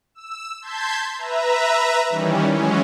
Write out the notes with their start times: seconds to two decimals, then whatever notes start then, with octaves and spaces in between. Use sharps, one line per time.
0.15 E6
0.62 A5 C6 G6 G#6 B6
1.16 B4 E5 A#5
2.09 D#3 E3 G3 C#4
2.51 E3 F#3 G#3 C#4